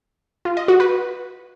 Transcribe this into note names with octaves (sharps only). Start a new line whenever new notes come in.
F4
D#5
F#4
B4